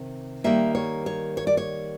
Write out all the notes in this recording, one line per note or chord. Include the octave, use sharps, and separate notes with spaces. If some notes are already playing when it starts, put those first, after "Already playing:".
Already playing: C3 D#3
D#3 G3 A#3 E5
C#5
C#5
C#5
D5
C#5